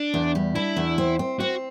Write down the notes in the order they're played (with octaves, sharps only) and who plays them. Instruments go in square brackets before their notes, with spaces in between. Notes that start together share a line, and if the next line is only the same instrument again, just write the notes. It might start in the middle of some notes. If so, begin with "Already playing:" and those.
Already playing: [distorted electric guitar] D4
[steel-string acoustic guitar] E2
G3
[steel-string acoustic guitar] D4 [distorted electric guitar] E4
[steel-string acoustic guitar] E2
C4
C4
[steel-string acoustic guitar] C4 [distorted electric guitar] F#4